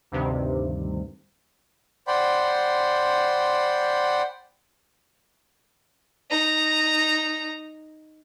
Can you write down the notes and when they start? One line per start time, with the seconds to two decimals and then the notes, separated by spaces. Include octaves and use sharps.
0.12 D2 G2 C3 D#3
2.08 C5 D5 F#5 G5 B5 C6
6.30 D#4 A#5